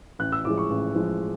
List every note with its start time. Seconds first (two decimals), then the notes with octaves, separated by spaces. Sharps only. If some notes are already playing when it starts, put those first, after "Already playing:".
0.19 A1 F#6
0.32 E6
0.45 A2 F3 G#3 D6
0.58 C#6
0.70 A1
0.95 A2 F3 G#3